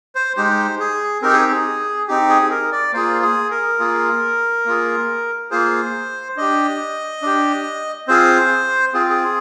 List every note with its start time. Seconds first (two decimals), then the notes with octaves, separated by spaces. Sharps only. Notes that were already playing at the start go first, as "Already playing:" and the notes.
0.15 C5
0.37 G#3 D#4 G4 C5
0.79 G#4
1.22 C4 D#4 G4 A#4
1.32 G#4
1.51 G#4
2.08 C4 D#4 G4
2.29 G#4
2.51 A#4
2.72 D5
2.93 A#3 F4 G#4 C5
3.22 G#4
3.51 A#4
3.79 A#3 F4 G#4
4.66 A#3 F4 G#4
5.51 A#3 F4 G#4 C5
6.37 D4 G4 D#5
7.22 D4 G4
8.08 C4 F4 G#4 C5
8.94 C4 F4 G#4
9.10 G#4